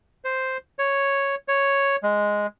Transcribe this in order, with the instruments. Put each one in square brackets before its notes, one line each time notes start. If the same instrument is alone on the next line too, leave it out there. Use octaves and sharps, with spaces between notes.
[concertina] C5
C#5
C#5
G#3